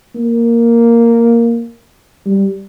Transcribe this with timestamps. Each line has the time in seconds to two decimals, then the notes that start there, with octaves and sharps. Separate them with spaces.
0.15 A#3
2.26 G3